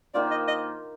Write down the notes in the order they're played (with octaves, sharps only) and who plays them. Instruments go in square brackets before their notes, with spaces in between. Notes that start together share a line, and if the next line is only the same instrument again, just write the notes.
[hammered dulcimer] D#3 A#3 F4 C5 [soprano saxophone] D5
[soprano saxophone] D#5
D#5